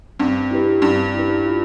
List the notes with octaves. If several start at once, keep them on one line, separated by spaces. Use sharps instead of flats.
G2 C4
E4 G4 B4
G2 C4
E4 G4 B4
F4